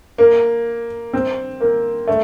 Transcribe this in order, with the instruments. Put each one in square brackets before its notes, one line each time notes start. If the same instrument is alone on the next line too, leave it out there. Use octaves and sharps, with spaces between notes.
[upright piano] A#3
C4
A#3
A3